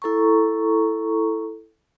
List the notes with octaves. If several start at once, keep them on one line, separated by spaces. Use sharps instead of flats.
E4 A4 A#5 C#6